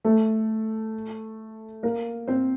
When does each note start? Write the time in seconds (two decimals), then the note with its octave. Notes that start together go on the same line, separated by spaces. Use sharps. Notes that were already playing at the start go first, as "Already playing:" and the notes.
0.05 A3 A4
1.83 A#3 A#4
2.28 C4 C5